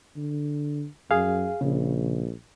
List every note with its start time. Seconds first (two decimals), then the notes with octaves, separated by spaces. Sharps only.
0.16 D3
1.11 F#2 G#4 F5
1.61 A#1 C#3